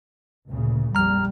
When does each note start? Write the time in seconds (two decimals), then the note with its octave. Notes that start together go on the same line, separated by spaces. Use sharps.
0.49 D2 A#2 C#3
0.95 A#1 F2 G3 A#5 F6